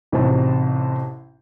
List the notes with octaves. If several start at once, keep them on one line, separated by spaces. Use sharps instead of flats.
A1 C3 D#4 F#4 C5 A5